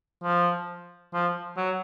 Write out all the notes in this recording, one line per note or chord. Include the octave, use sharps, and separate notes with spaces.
F3
F3
F#3